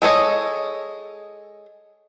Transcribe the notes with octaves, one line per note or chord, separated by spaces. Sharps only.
G#3 A4 C#5 D#5